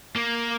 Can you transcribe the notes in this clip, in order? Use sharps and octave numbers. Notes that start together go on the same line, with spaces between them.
A#3